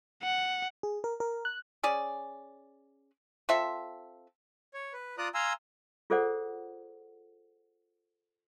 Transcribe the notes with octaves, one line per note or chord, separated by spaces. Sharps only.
F#5
G#4
A#4
A#4
F#6
C#4 G#4 D5
C4 F4 A4 E5
C#5
B4
F4 D5 A#5 D#6 F#6
F5 G#5 A#5 C6 E6
F4 G#4 A4 C5 D5 F#5